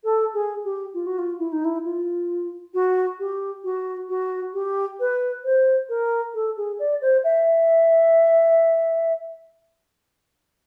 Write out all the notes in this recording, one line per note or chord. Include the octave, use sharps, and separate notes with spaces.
A4
G#4
G4
F4
F#4
F4
E4
D#4
E4
F4
F#4
G4
F#4
F#4
G4
B4
C5
A#4
A4
G#4
D5
C5
E5